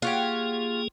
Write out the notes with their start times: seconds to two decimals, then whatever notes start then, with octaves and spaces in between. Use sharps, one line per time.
0.02 A#3 F4 G4 G#4 C#5 F#5